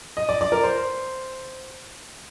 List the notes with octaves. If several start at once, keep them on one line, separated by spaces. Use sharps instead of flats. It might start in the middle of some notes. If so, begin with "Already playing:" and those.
D#5
D5
D5
A#4
C5